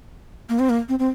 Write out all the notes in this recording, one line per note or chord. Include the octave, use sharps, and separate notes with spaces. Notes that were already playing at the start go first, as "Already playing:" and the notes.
A#3
C4
A#3
C4
C4